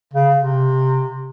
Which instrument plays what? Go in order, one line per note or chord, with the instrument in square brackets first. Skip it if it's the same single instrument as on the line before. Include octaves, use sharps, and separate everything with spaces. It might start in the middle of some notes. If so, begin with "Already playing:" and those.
[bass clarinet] C#3
C3